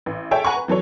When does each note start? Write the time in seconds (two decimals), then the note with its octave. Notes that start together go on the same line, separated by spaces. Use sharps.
0.06 A1
0.31 G#4 A4 C#5 E5 G5 A5
0.45 F#5 G#5 A#5 B5 C#6
0.56 B4
0.68 E3 F#3 A4 C#5